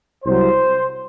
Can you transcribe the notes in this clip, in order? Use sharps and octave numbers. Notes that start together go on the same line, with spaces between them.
C2 C3 F#3 C5